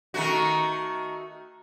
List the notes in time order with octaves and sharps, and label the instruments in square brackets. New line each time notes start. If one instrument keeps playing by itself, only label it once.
[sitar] D#3 A3 F#4